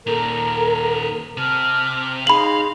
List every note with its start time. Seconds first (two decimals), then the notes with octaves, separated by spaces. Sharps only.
0.07 A#2 D#3 A4 A#4 A#5
1.37 C3 A5 F6
2.27 D#4 G#4 F5 B5 C6 F#7